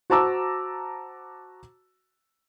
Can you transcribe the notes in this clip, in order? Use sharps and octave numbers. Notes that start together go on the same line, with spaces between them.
F#4 C5 A5 A#5 D6 E6